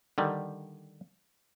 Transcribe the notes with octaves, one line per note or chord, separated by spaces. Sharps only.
D3 D#3 G3